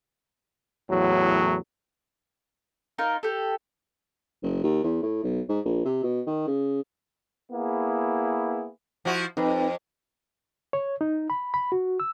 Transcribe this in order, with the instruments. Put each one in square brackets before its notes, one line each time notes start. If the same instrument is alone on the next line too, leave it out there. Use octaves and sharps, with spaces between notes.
[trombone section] E2 A2 F#3
[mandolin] D#4 F4 A#4
G4 A4
[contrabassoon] F#1
D#2
E2
A2
B1
G#2
A#1
C3
B2
D#3
C#3
[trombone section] A#3 B3 E4 G#4
[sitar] F3 E4 F#4
[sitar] F2 [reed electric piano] C4 D#4 B4
[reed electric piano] C#5
D#4
B5
B5
F#4
E6